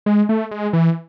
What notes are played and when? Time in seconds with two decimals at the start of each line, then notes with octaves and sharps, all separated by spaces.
0.06 G#3
0.29 A3
0.51 G#3
0.73 E3